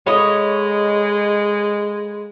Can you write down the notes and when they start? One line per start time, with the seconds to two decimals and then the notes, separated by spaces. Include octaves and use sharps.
0.07 G#3 A4 C#5 D#5 F5 B5